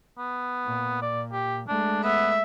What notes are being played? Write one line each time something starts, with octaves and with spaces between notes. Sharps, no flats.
B3
A#2
D5
G4
G#3 A3 D4
B3 E5